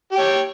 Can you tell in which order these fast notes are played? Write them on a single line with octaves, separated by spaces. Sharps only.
G4 G5 C#5